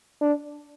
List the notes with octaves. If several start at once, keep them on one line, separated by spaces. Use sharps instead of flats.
D4